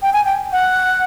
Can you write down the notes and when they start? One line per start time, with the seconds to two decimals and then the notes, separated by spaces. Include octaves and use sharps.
0.02 G5
0.13 G#5
0.25 G5
0.52 F#5